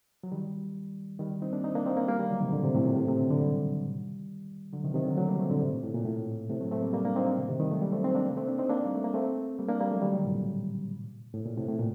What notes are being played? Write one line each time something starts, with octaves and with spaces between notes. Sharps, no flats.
F#3
D#3 G3
D#3 G3
C4 D#4
A#3 D4
C4 D#4
A#3 D4
C4 D#4
A#3 D4
G3 A#3
D#3 G3
D3 F#3
C3 D#3
A#2 D3
A2 C3
A2 C3
A#2
A2 C3
A2 C3
A#2 D3
D3 F#3
D#3 G3
D3 F#3
C3 D#3
C3 D#3
D3 F#3
F#3 A3
G3 A#3
A3 C4
A#2 D3
A2 C3
A#2
A2
A#2
A2
A2 C3
F#3 A3
A3 C4
G3 A#3
G3 A#3
A#3 D4
C4 D#4
A#3 D4
C3 D#3
C3 D#3
D#3 G3
F#3 A3
G3 A#3
A3 C4
C4 D#4
A#3 D4
A3 C4
A#3 D4
C4 D#4
A#3 D4
G3
A3
A#3
A3 C4
G3 A#3
A#3 D4
G3 A#3
F#3 A3
D#3 G3
D3 F#3
A2 C3
A#2
A2
A#2
A2 C3
A2
A#2